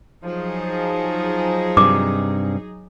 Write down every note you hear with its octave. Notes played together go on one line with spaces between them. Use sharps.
F3 F#3 D#4 G#4
G2 C3 D6